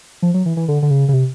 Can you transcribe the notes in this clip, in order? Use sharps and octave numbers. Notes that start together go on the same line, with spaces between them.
F3
F#3
E3
E3
D3
D3
C#3
C#3
C3